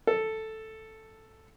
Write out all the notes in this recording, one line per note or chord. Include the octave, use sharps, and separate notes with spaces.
A4